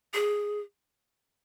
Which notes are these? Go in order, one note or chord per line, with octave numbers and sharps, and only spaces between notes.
G#4